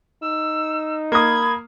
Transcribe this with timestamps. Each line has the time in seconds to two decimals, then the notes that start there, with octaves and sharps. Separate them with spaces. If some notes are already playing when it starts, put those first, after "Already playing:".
0.23 D#4 E6
1.12 A#3 B5 D#6 G#6